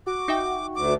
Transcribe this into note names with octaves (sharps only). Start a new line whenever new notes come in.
F#4 D6
D#4 E5 G5
D2 D6